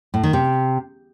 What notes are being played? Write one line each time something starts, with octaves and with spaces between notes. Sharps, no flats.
A2
D#3
C3